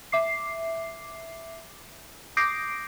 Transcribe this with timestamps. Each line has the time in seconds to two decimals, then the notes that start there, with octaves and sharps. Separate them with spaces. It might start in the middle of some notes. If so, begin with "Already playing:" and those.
0.12 E5 D6 C7
2.37 D6 D#6 G6 A#6 C7 D7